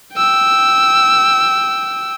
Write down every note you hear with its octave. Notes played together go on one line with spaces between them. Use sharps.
G5 E6